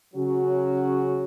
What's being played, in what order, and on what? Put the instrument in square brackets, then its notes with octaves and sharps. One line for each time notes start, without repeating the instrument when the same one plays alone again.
[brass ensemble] C#3 F#3 C#4 F#4